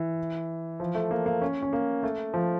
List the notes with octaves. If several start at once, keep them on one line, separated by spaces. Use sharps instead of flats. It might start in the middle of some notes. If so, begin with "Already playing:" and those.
Already playing: E3
F3
A3
A#3
A#3
C#4
C#4
A#3
A3
F3